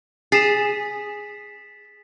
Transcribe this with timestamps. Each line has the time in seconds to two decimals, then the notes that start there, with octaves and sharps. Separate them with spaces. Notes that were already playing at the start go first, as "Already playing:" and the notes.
0.32 G#4 A6 B6 C7 E7